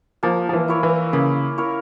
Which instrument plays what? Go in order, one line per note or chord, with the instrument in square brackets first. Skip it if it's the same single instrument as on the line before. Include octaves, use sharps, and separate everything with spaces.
[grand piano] F3 [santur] A#3
[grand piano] F3
E3
[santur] E4 A#4 C#5
[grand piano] E3
[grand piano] C#3 [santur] A#3
[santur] E4 A#4 C#5